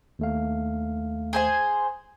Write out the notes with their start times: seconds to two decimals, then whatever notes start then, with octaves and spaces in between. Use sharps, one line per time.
0.19 D#2 A3 F5
1.33 G#4 C5 G#5